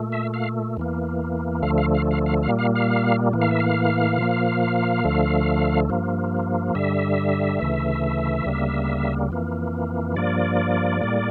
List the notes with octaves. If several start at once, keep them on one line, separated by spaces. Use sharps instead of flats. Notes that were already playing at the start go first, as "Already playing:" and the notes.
Already playing: A#2 A3
E5
F5
E2 E3 A#3
D2 D3 F3 A3 F5
F5
F5
F5
F5
F5
A#2 G3 A#3
F5
F5
A2 E3 A#3
F5
E5
F5
A#2 F3 A#3
D2 D3 F3 A3
G2 F3 A#3
G2 D3 G3 E5
D2 C#3 E3 A3
D2 C#3 G3 A#3
F2 E3 A#3
G2 F3 A#3 D5
A2 G3 A#3